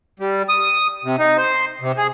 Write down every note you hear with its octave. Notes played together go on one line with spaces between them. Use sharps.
G3
D#6
C3
D#4
C5
C3
G#4